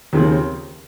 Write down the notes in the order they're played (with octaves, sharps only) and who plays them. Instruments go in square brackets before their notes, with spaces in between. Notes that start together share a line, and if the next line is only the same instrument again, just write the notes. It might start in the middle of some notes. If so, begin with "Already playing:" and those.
[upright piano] D#2 C#3 F3 C4